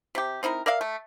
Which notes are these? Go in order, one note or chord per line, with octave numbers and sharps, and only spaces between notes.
C3 G4
C4 D#4 E4 A#4
A#4 D5 E5 F5
A3